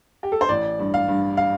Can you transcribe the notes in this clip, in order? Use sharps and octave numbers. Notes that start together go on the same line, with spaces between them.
G4
A4
C5
A1 D5
G2
F5
G2
F5